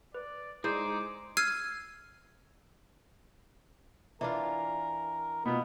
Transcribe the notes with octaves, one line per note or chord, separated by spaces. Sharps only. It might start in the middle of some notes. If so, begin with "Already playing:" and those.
B4 D5
G#3 D#4 E4 G#4 C5 D5 D6
E6 F6 G#6 C7 D#7
E3 D4 F4 A#4
B2 B3 F4